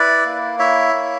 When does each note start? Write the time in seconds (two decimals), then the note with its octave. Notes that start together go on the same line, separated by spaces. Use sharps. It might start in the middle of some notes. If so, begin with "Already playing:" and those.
Already playing: E4 B4 D5
0.25 A#3
0.59 E4 C#5 E5
0.93 A#3